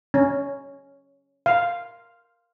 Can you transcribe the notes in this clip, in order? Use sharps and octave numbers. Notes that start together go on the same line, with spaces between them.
C#4
F5